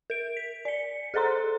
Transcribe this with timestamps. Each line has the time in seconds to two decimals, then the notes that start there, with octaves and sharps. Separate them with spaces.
0.10 A#4 D7
0.37 B6
0.65 D5 C#7
1.14 G#4 A4 C5 A#5 C6